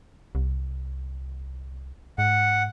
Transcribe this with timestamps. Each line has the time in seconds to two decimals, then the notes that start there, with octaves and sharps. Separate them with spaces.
0.35 C2
2.18 G#2 F#5